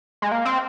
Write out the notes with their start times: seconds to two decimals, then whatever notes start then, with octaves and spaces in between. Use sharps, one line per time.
0.22 G#3
0.32 A#3
0.45 C4